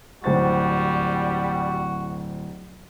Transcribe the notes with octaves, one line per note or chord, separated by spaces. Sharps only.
D1 G3 F#4 C5 A6